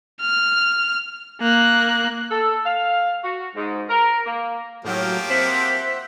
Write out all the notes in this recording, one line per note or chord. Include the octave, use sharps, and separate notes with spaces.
F6
A#3 F#6
A4
F5
F#4
G#2
A#4
A#3
A2 F3 F#3 A#3 G4
C4 C5 E5 F#5 B6